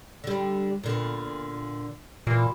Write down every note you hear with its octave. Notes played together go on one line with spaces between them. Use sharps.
D3 G3
A#2 D3 B3
A#2 E3